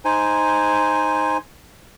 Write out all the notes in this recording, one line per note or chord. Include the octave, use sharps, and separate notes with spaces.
D#4 C5 G#5